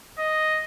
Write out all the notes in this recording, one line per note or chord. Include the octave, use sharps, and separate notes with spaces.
D#5